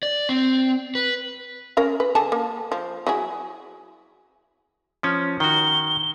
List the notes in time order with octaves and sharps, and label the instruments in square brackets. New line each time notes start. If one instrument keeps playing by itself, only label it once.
[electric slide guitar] D5
C4
B4
[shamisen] C#4 A#4 F5
B4
D3 G#4 A5
A#3
F3
F#3 E4 G#4
[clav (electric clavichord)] F3 C#4
[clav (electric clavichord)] D#3 F#4 [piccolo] G7